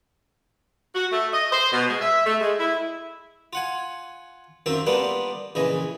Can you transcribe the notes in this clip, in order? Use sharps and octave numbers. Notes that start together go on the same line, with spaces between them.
F#4
A3
D#5
C5
B2
G#3
E5
A3
G#3
E4
F4 F#5 G#5
F#2 D#3 C4 F4 E5
G3 A#3 B3 D4 F4
A#1 C#3 E3 D#5